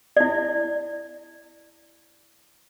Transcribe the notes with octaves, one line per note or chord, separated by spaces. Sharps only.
E4 D5